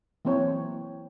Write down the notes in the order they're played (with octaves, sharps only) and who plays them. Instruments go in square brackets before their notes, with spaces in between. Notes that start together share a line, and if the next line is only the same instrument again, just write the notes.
[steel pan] E3 F#3 A#3 C4 C5 C#5